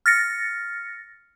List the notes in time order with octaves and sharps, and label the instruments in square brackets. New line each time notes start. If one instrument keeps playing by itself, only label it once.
[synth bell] F6 A6 A#6 C#7